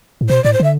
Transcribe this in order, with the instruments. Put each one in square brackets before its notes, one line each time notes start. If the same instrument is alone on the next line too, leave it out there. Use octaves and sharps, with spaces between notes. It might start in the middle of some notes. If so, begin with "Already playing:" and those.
[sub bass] A2
[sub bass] B2 [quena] C5
[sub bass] A2 [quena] D5
[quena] C5
[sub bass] D3 [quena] E5